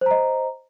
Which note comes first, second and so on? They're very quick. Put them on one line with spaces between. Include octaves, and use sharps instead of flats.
C5 A#5 D#5